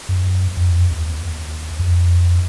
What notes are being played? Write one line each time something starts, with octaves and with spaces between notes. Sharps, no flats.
F#2
F2
D#2
F2